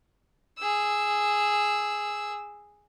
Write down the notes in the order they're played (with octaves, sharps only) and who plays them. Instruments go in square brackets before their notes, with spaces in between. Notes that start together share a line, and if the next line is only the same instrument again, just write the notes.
[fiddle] G#4 E6